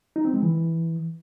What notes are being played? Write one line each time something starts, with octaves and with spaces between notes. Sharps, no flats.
D#4
C4
G#3
E3